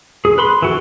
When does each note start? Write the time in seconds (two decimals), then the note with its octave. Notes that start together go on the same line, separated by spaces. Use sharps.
0.25 G#4
0.38 B4 B5 C6
0.62 E3 F#4 A4